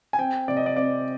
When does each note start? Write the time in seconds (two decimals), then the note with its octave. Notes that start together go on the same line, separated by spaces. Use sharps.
0.13 G#5
0.19 C4 G5
0.48 C3 D5
0.57 D#5
0.66 D5
0.76 C4 D5